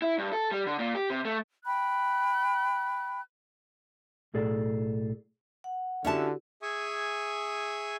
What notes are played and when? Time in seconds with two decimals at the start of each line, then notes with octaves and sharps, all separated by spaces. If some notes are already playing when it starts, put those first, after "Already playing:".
0.02 E4
0.18 G2
0.33 A4
0.52 G3
0.66 D3
0.79 A#2
0.95 G4
1.10 C3
1.25 A3
1.65 G5 B5 F#6
4.34 B1 A2 G#4 A4 D5
5.64 F#5
6.05 D3 C#4 E4 F#4 G4 E5 A5
6.62 G#4 E5 G#5 C#6 D#6